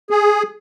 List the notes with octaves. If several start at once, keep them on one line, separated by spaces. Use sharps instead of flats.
G#4